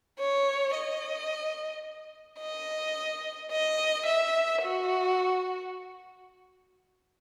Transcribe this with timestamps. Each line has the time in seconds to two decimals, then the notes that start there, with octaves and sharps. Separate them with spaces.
0.19 C#5
0.75 D#5
2.40 D#5
3.51 D#5
4.06 E5
4.62 F#4